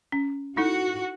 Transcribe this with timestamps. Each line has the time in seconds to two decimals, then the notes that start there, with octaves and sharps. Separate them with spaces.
0.12 C#4
0.57 D#4 E4 F#4 A4